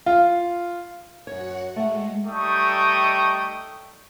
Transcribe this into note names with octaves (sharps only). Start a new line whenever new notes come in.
F4
F#2 F#4 C#5 F#5
G#3 A3 F#5
G3 A3 D#4 G5 C#6 D#6